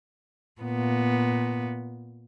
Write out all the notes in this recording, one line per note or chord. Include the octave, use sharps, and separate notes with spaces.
A#2 B3